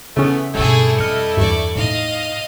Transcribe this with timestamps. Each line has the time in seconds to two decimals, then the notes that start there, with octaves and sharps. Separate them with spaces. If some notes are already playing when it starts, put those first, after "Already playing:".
0.17 C#3 E3 A3 B3 C#4
0.54 G2 B2 G3 A3 E4 G#4 A4
0.98 F2 D#5 F6 C#7
1.37 E2 G2 D5 C#6
1.75 A2 D#4 D#5 F5